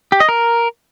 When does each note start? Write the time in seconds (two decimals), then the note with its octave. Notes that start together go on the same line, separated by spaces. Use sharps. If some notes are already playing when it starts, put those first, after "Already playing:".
0.12 G4
0.20 D#5
0.29 A#4